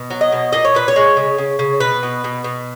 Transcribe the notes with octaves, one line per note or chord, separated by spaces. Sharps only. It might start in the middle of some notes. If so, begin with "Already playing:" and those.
Already playing: B2
F#3
D#5
B2
A#2 D#5
C#5
A#2 B4
C#5
G#3
C#3
C#3
C#3
B2 B4
B2
B2
B2